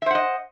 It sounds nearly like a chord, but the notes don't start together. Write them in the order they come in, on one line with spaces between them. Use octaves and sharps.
E5 C5 F#5 D#5